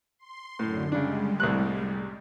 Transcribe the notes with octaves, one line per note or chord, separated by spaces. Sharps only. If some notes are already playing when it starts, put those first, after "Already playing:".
C6
F#2 A2 D3
C#3 G3 G#3 D4
C2 A2 F#6